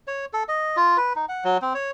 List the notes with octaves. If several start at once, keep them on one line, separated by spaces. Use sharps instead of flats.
C#5
A4
D#5
F4
B4
D#4
F#5
F#3
C4
C#5